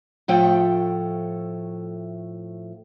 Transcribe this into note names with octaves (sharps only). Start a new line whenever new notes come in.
A2 F3 A3 G5